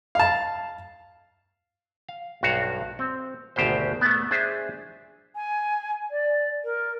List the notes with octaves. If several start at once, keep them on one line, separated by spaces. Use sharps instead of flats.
F5 A5
F5
B1 G2 F#4 F5
C4
G#1 D2 B2 G4 C5
A3 B3
D4 G#4 C5 E5
G#5
D5
A#4